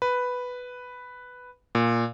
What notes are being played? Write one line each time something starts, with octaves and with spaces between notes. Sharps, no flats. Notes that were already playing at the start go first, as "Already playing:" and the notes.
B4
A#2